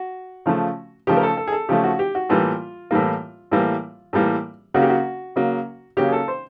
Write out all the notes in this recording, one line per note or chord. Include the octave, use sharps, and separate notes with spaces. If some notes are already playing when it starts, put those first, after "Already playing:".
Already playing: F#4
C#3 F3 A3
C#3 F3 A3 G4
A#4
A4
A4
G#4
A4
C#3 F3 A3 G4
F#4
G4
F#4
A2 E3 G3 A#3 F4
A2 E3 G3 A#3
A2 E3 G3 A#3
A2 E3 G3 A#3
C#3 F#3 A#3 F#4
G4
F#4
C#3 F#3 A#3
C#3 F#3 A#3 G4
G#4
A4
C5